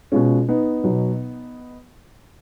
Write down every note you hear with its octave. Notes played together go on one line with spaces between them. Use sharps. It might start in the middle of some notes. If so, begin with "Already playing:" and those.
B2 G#3 C#4 F4
B3 D#4
B2 F#3